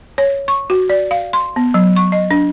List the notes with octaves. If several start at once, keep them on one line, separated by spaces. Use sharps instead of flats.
C#5
C#6
F#4
D5
F5
C6
B3
F#3
C#6
D#5
D4